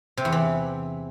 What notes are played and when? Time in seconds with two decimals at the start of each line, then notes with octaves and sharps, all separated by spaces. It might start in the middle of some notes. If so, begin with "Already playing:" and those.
0.17 C3
0.25 E2
0.32 E3